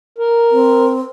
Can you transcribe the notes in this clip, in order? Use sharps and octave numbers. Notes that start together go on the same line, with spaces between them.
A#4
C4